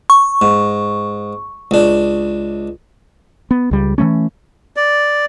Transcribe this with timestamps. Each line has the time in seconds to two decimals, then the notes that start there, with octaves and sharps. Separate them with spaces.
0.10 C#6
0.42 G#2
1.71 C#2 D4
3.51 B3
3.71 C#2 G3
3.98 E3 F#3 A3 C#4
4.76 D5